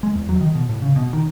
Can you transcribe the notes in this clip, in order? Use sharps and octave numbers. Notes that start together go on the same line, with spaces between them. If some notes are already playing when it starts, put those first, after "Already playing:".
G#3
E2
F#3
D#3
B2
A2
C#3
B2
D#3